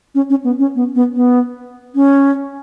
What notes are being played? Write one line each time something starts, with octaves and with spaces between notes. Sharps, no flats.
C#4
C#4
B3
C#4
B3
B3
B3
C#4